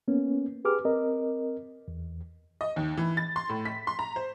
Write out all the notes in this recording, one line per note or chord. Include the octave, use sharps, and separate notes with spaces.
A#3 B3 C#4
G4 G#4 B4 D6 F6
C4 A#4 D#5
E2
D#5
D#2
E3
A6
C6
A2
B6
C6
A#5
C5